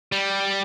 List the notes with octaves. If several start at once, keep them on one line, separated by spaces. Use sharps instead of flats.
G3